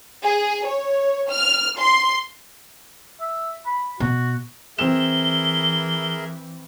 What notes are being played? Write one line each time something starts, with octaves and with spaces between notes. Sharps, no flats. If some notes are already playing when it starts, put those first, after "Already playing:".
G#4
C#5
F6
C6
E5
B5
B2 F#4
E3 C4 G#4 A#4 E5 E7 G7